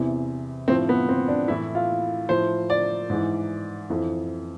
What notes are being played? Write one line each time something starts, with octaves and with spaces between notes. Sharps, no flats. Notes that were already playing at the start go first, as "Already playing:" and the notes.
Already playing: E2 C3 E3
A2 F3 C4
B3
C4
D4
A2 E3 E4
F4
A2 F3 C5
D5
G#2 E3
F2 E3